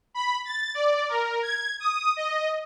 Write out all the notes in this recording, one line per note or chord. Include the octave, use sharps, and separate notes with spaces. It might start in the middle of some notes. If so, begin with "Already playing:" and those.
B5
A6
D5
A#4
G#6
D#6
D#5